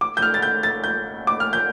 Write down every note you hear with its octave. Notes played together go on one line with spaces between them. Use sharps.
D6
G6
F6
A6
G6
A6
G6
D6
F6
G6